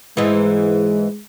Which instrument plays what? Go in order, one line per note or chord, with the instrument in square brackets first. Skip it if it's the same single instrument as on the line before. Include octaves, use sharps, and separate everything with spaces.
[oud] G#2 E3 [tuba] G#3